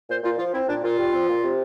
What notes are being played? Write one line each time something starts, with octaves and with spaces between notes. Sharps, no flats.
A#2 C5
A#2 F4
F3 F4
C4 E4
A#2 D4
A#2 F4
G3
C4
A#2
C3